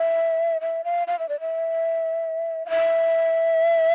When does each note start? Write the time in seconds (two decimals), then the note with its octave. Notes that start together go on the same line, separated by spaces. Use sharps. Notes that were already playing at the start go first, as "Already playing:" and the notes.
Already playing: E5
0.61 E5
0.84 F5
1.07 F5
1.19 E5
1.29 D5
1.40 E5
2.66 F5
2.70 E5